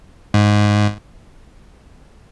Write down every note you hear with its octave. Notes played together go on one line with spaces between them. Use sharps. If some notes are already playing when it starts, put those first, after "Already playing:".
G#2